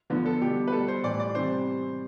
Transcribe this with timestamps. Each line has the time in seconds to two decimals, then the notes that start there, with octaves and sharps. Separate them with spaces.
0.10 E2 D3 F3 B3
0.26 A4
0.40 B2 G3 G4
0.68 B4
0.72 B2 G3 A4
0.88 C5
1.03 A2 E3 G3 D5
1.20 D5
1.35 C3 E3 G3 C5